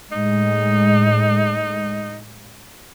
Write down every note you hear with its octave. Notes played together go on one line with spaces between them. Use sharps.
A2 G#3 D#4